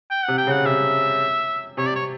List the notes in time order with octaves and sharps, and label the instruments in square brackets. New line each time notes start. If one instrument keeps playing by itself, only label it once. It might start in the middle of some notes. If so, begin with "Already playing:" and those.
[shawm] G5
[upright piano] C3 [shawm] F#5
[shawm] G5
[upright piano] C#3
[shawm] F#5
[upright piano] C3 [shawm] E5
[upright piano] C3 [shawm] C#5
[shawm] D5
C#5